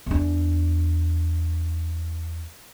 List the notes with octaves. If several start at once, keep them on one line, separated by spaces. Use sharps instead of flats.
E2 D4